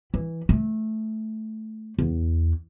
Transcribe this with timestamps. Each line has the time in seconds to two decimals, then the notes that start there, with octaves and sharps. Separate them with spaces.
0.14 E3
0.49 A3
1.99 E2